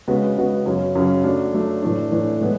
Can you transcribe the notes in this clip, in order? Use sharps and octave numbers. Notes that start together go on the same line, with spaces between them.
C#3 G#3 B3 F#4
C#3 G#3 B3 F#4
F#2 C#3 F#3 C#4
F#2 C#3 F#3 C#4
F#3 A3 D4
F#3 A3 D4
A2 E3 A3 D4
A2 E3 A3 D4
A2 G#3 B3